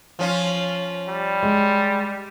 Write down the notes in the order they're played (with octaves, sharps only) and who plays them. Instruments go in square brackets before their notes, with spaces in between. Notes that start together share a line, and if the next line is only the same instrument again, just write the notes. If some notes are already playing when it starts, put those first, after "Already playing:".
[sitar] F3 C#4 F4
[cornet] G3
[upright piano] G#3